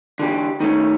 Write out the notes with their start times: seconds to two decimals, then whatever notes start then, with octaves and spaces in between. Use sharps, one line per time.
0.19 D3 E3 G4
0.60 D#3 A3 C#4